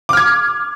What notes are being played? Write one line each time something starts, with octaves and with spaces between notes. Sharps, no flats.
D6 F6 G#6